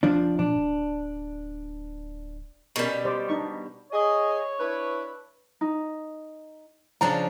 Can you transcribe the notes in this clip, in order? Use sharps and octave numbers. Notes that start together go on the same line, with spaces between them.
F#1 F3 D4
A#2 D4
D1
B2 G3 C#4 A#4 B5
G4 C5 D5
D4 D#4 C#6
G#4 C#5 D#5
D4 E4 B4
D#4
C#3 F3 D4 A#5